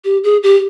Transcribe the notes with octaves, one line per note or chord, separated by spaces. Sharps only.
G4
G#4
G4